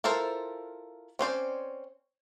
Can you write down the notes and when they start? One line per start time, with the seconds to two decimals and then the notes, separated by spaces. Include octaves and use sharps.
0.04 E4 F4 A4 A#4 C5
1.19 C4 C#4 C5 D5